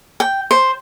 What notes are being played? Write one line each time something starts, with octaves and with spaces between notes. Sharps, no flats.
G5
C5